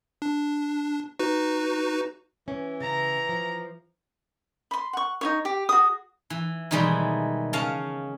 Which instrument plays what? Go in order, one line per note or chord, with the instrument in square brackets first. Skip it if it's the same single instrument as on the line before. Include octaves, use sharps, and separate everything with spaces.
[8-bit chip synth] D4
D#4 F#4 B4
[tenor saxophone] E3 [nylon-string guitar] C#4
[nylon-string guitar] C#3 [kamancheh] A#5
[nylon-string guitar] F3
[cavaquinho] B5 C6
F#5 C#6
D#4 E4 C#5
G4
F#4 G#4 D#6
[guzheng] E3
B2 D#3 E3 G3 G#3
C#3 C#4 F5 A5